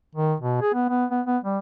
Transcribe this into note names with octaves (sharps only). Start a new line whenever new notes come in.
D#3
B2
G#4
B3
B3
B3
B3
G3